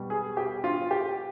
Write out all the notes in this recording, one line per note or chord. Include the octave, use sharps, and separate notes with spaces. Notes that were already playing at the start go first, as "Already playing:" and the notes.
Already playing: B2 G3
G#4
G4
F4
G4